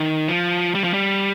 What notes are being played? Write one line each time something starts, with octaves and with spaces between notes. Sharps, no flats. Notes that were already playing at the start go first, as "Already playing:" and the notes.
Already playing: D#3
F3
G3
F3
G3